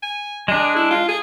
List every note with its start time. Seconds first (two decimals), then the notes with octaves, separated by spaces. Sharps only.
0.02 G#5
0.48 G#3 D4 G#4
0.76 E4
0.91 F4
1.08 G#4